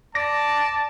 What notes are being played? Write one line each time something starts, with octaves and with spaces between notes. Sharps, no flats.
D5 A5 A#6